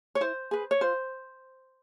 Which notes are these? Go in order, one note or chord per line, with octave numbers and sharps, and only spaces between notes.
C#5
E4 C5
G#4 B4
C#5
F4 C5